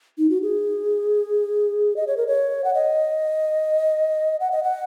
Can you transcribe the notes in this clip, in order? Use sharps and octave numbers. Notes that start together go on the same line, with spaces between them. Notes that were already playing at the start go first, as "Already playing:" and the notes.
D#4
F#4
G#4
D#5
C#5
A#4
C#5
F#5
D#5
F#5
D#5
F#5